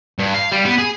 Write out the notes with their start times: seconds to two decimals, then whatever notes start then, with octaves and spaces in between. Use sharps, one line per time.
0.19 G2
0.34 F5
0.52 G3
0.65 B3
0.78 G#4